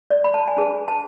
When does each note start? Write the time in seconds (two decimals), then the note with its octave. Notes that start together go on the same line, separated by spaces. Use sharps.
0.10 D5
0.24 B5
0.34 A5
0.48 G#5
0.57 D4 G#4 B4 A5
0.88 A5